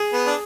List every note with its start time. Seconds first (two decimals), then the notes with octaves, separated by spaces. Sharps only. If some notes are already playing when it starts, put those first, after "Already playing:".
Already playing: G#4
0.13 B3
0.26 D4